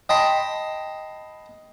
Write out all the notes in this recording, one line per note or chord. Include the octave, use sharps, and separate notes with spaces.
D#5 G5 A5 B5 C6